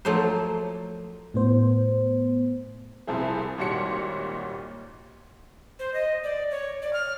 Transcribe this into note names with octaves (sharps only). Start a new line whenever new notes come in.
F3 F#3 A3 A#3 C5
A2 B3 C5
C2 C3 F3 E4 G#4
G#1 A#2 G3 F#4 C#5 C#7
C5
D#5
D5
C#5
D5
F6